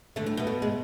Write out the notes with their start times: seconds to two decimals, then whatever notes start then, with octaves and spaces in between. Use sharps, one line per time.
0.16 D3 A3
0.26 A2
0.37 B2 B3
0.47 A3
0.62 G#3